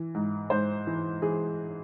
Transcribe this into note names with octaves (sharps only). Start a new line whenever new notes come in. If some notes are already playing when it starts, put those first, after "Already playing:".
Already playing: E3
G#2
G#2 C5
E3
E3 G#4